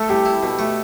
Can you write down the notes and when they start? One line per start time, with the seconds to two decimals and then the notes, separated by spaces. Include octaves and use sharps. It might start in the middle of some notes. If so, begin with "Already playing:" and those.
Already playing: A3 A4
0.09 C2 G4
0.26 E4
0.43 B2
0.59 A3